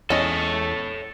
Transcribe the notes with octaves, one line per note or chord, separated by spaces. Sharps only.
E2 C#4 A4 C#5 D#5